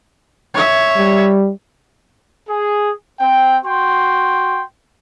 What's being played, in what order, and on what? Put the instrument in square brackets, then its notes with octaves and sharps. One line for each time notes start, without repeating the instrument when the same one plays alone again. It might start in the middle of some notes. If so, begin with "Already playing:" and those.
[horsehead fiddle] C#5 E5
[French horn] G3
[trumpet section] G#4
C4 G5
F#4 G5 C6